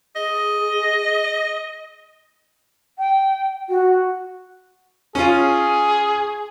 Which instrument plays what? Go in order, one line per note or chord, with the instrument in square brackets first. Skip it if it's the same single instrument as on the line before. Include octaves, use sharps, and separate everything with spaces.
[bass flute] G#4 [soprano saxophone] D#5
[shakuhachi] G5
F#4
[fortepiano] C#4 F4 [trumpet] G#4